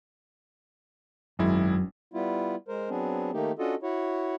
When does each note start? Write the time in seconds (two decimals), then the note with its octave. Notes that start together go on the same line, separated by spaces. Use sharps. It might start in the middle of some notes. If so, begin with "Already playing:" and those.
1.39 G#1 F#2 G#3 E4
2.14 G3 B3 E4 F4
2.68 G#3 A#4 C5
2.89 F#3 B3 C4 D4 G#4
3.33 D#3 A3 A#3 D#4 G4
3.59 C#4 D4 F4 F#4 A4 D#5
3.83 E4 F#4 C#5